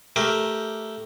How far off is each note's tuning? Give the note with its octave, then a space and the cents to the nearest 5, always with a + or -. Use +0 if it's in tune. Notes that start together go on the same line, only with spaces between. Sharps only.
A3 -5 G4 +0 A#4 +5